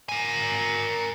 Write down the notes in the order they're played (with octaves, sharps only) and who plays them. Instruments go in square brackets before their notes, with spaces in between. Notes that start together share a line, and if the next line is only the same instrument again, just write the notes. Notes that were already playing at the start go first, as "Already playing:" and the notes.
[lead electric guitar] A#4 G#5